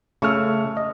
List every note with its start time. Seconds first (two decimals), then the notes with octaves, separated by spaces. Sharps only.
0.22 C#3 A3 C#6 E6 F6
0.77 D#5